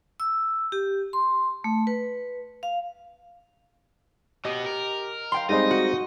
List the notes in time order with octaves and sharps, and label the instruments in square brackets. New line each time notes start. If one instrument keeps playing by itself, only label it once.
[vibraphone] E6
G4
C6
A3
B4
F5
[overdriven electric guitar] B2 B3 [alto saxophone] G4 [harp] D#5
[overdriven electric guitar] A#4
[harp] F5 G5 C6
[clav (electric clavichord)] G3 G#3 C4 [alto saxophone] D#4 [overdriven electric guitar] D#5
[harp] F#4